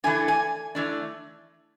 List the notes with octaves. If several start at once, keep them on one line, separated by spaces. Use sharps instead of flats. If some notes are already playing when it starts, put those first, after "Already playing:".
E3 A3 D4 G#5
G#5
E3 A3 D4